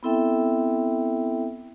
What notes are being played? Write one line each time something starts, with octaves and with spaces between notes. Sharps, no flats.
B3 C4 E4 A4 E5 G5